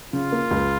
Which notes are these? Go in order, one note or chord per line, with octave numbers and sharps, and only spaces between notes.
C#3 F4
A#3
C#2